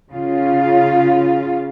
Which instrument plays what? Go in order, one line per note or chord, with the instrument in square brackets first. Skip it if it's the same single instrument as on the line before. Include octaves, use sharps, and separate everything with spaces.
[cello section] C#3 F4